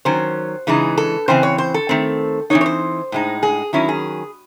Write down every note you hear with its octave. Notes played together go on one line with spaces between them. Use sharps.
D#3 F#3 C#4 C5
C#3 E3 G#3 D#4
A4
C#3 E3 C4 C5
C#5
C5
A4
D#3 A3 C4
E3 C4 D#4 C#5
C#5
C5
A2 G#3 D#4
G#4
D#3 F#3 C#4 E4
G#4